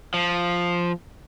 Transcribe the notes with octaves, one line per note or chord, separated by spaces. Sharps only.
F3